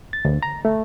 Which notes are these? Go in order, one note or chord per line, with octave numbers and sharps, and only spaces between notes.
A6
D2
A#5
A3